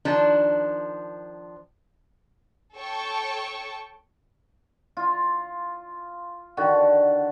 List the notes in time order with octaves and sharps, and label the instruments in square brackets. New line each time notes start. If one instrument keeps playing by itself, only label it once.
[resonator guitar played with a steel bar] D#3 F3 D4
[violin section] A4 C#5 G5 A5 C#6
[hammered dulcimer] F4
D3 D#3 F#4